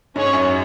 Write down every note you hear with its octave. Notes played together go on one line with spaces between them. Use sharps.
G#2 C#4 G#4 C#5
F#2